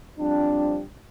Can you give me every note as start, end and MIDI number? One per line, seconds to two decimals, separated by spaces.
0.18 0.81 53
0.18 0.81 55
0.18 0.81 60
0.18 0.81 62